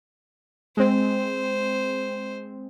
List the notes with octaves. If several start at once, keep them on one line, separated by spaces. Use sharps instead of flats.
G#3 C4 C5